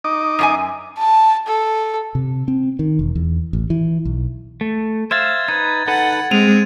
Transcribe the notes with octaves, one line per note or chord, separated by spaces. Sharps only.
D#4 D#5 D6
F#2 F4 G#5
A5
A4
C3
C4
D#3
E1
E2
A1
E3
B1
A3
C5 E5 F5 G#6 A6
D#4 B4 G#6
D#4 A4 B4 F#5
G#3 C4 D#7 F7